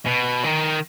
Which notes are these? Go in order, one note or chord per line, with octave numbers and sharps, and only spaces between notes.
B2
D#3